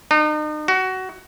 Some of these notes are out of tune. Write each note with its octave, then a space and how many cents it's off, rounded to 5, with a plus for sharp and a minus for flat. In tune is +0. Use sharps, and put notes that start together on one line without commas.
D#4 -40
F#4 +20